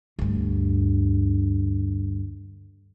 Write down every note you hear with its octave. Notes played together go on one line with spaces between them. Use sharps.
D2 G2